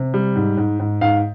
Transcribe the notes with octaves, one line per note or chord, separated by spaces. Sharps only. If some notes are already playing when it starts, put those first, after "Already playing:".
Already playing: C3
G3
G#2
G#2
G#2
G#2 F5